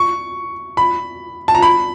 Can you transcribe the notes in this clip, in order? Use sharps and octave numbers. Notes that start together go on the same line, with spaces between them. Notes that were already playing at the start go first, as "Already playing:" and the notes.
Already playing: C#6
B5
A5
A#5
B5